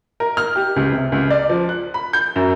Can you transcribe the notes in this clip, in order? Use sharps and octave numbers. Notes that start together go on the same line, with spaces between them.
A#4
F6
G4
C#2
C3
C#2
D5
F3
F#6
B5
G6
F#2